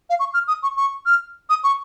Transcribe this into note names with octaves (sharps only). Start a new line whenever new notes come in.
F5
C#6
F6
D#6
C#6
C#6
F6
D#6
C#6